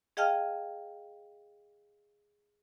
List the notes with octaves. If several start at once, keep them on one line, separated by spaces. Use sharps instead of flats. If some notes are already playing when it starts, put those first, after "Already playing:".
G#4 D#5 F5 G5 A5 F6